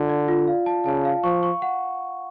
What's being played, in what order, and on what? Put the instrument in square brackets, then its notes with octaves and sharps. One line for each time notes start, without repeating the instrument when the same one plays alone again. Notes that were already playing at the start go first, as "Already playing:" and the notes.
Already playing: [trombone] D3 [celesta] D4 F4
[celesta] D5
F4
F5
A5
[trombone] C#3 [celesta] A5
[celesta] F5
[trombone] F3 [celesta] C#6
[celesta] C#6
F#5